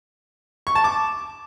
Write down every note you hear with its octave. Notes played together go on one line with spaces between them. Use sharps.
C#6
A5
D6